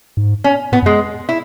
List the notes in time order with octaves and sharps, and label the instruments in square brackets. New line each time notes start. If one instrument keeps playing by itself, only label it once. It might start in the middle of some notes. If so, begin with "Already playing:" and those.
[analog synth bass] G#2
[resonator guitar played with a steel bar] C#4
[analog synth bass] A2 [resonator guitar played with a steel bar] B3
[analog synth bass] F#2
[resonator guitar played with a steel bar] G#3
E4